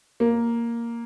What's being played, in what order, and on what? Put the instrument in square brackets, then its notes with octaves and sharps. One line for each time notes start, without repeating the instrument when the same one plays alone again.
[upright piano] A#3